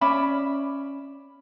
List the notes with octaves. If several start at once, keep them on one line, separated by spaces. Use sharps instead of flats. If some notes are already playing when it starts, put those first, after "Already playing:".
C#4 D5 E5 B5